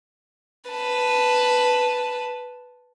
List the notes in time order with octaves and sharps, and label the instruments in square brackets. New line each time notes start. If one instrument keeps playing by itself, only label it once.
[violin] B4 A5